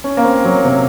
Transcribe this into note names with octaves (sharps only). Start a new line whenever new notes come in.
C#4
A#3
C4
F#3
C3